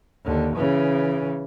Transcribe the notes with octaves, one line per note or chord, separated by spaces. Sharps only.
D#2 D3
C#3 E3